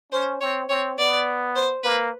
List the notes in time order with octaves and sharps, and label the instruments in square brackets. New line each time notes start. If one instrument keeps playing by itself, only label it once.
[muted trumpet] C#4 [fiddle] C5
[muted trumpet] C4 [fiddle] C#5
[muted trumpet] C4 [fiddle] C#5
[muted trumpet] B3 [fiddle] D5
[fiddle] C5
[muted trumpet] A#3 [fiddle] B4